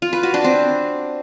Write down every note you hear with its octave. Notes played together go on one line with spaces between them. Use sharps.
F4
B4
F#4
D4
C4